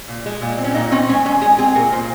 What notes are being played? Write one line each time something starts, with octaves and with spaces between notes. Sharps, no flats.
A#2
G#3
A#2
C4
C#4
A#2 D#4
C4 C#4
G#3 C#4
G#3 C#4
G#3 G#4
C4 G#4
A#2 A#4
A#2 C5